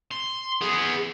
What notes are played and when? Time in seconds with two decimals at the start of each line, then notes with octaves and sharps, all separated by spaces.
0.11 C6
0.61 B3 G#4